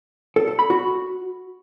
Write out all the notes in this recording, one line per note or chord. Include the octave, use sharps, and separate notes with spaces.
A4
A4
B5
F#4